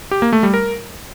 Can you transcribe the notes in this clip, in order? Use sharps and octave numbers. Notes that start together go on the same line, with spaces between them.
G4
A#3
A3
G3
A#4